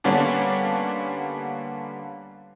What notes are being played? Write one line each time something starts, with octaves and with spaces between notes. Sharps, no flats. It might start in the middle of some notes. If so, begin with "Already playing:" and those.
D3 G3 A#3 B3 C#4 D4